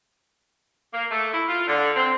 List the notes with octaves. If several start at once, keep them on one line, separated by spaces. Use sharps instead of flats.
A#3
A3
E4
F4
D3
C4